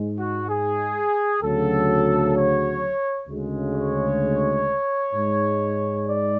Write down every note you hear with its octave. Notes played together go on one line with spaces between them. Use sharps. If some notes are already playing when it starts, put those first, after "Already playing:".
Already playing: G#2 G#3
F#4
G#4
D2 C#3 F#3 A4
C#5
D2 C#3 G#3
C#5
G#2 G#3
D5